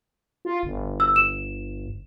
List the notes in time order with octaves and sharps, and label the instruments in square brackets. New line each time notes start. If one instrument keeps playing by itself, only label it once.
[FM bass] F4
G1
[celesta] E6
E7